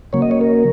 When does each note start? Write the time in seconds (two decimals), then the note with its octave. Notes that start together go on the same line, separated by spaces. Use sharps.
0.13 C#3 F#3 A#3 C#5
0.22 D#5
0.31 C#5
0.41 A#4